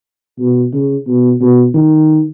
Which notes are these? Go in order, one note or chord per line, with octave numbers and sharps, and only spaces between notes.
B2
C#3
B2
B2
D#3